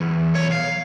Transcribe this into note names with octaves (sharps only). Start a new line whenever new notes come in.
E2
B1 C#5
F5